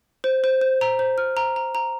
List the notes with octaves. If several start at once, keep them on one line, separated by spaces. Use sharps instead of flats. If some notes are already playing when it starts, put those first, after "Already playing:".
C5
C5
C5
A#5
C5
F6
A#5
A#5
A#5